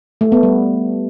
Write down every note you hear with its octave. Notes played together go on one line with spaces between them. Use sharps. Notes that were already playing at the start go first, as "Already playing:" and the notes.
A3
B3
G3